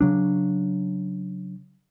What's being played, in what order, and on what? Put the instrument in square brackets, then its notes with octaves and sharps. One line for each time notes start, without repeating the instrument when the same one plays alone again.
[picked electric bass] C#3 F#3 D4